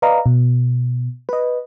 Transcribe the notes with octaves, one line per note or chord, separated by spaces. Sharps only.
B4 D5 D#5 F5 A#5
B2
B4 D#5